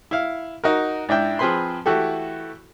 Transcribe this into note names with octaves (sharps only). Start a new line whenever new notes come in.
E4 F5
D#4 F#4 A#4
G#2 D4 E4 G5
F3 C4 G#4 B4 B5 C6
E3 A3 E4 F#4 G4 A4